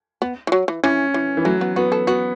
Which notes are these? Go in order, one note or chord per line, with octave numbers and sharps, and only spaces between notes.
B3
E3
F#3
E3
E3 C#4
E3
E3
F#3 A3
B3
B3 F#4
A4
B3 F#4